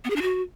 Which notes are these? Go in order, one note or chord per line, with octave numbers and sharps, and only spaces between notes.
B3
G#4
D4
F#4